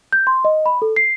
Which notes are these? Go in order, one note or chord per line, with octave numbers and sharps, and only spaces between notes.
G6
C6
D#5
B5
A4
C7